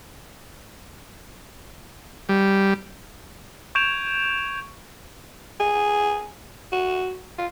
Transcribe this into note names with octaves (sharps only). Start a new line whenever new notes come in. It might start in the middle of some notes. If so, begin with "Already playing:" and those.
G3
C#6 G6 G#6 D7 E7 F7
G#4
F#4
F4